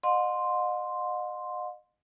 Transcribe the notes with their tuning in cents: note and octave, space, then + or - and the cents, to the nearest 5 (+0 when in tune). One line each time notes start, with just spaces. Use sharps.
D#5 -30 F#5 -45 C6 +0